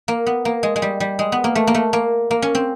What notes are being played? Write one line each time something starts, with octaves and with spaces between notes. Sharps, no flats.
A#3
B3
A#3
G#3
G#3
G3
G3
G#3
B3
A#3
A3
A#3
A3
A#3
A#3
C#4
C4